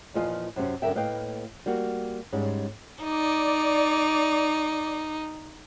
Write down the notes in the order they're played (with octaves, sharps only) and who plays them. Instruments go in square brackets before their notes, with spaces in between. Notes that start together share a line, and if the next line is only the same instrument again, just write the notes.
[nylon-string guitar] E2 A#2 F3 F4 D#5 G#5
F#2 C3 C4 C#4
F#2 D3 D4 A#4 E5 G5
A2 A#3 B4 D#5 F5 G5
G3 A#3 F#4
G#2 G3 C#4
[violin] D#4 [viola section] D5